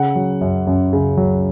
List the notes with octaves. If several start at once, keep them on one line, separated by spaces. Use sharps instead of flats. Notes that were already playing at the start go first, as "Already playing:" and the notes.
Already playing: C#3 F#5
F#3
F#2
F#2
C#3
F#3